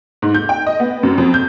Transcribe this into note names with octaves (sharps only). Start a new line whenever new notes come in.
G#2
G6
G5
D#5
B3
F#2
F2
G6